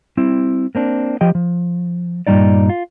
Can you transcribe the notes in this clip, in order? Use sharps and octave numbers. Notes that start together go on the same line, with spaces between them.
G3 C4 E4
A#3 C4 D4
F3 G4 D#5 G5
F3
G2 A#2 C#3 G3 D#4 D5
F4